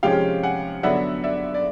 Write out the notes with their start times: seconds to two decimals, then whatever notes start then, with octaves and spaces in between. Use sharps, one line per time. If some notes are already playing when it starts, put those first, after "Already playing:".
0.03 C3 F3 G#3 C#4 F5 G5
0.43 F#5 G#5
0.83 D3 F#3 B3 D4 E5 F#5
1.24 D5 E5
1.54 D5